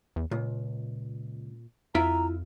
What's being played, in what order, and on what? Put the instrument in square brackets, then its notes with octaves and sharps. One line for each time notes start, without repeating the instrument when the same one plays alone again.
[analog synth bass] E2
[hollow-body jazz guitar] C#2 [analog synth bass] A#2
[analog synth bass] F2 [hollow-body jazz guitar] E4 F4 E5 [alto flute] A#5